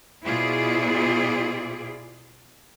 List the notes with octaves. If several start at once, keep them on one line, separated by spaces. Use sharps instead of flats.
B2 E4 F4 G#4 C5 D5